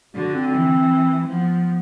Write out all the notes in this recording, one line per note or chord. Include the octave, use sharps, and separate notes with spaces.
D3 F#4
C4
E3
F3 B3